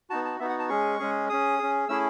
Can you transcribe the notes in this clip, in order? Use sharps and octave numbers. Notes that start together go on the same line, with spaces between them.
B3 D#4 F#4 A5
A5
B3 D#4 F#4 E5
F#5
A5
G#3 C#4 G#4 C#6
G#3 C#4 G#4
C#4 G#4 D#6
C#4 G#4
A3 C#4 E4 G#4 E6